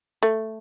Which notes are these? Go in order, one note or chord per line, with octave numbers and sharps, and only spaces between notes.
A3